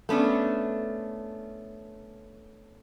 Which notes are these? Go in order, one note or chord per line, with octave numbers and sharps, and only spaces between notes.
A3 B3 C#4 D4